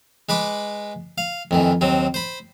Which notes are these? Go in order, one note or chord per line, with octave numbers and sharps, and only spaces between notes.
G#3 B4 B5 D6
F5
F2 D#3 E3
D#2 F#3 C4
C5 B5